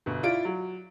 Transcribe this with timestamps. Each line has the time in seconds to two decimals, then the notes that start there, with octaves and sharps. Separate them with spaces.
0.06 G1 B2
0.23 E4 F4 D5 D7
0.45 F#3